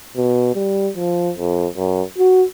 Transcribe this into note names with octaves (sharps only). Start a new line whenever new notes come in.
B2
G3
F3
F2
F#2
F#4